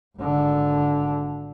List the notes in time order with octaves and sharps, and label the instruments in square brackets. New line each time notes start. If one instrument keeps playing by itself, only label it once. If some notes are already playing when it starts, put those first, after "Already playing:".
[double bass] G#1 D3